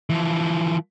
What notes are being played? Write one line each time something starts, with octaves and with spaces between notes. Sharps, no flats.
E3 F3